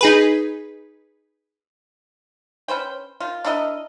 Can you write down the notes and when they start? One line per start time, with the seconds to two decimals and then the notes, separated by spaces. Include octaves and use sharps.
0.01 D#4 G#4 B4
2.68 C#4 B4 C5 G5
3.20 D#3 F4
3.45 D4 E4 A#4 D#5